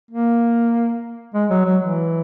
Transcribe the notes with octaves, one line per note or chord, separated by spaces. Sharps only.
A#3
G#3
F#3
F#3
E3